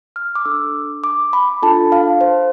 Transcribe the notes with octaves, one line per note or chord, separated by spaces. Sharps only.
F6
D6
D4 A4 E6
D6
B5
D4 F4 A4 A5
F5
C5